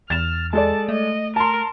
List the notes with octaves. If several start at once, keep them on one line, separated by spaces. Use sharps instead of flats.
E2 F6 A6 E7
G#3 A4 D5 A5
A3 D#5
A#4 A5 C6